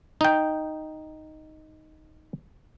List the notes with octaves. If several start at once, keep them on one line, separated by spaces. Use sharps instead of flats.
D#4 G5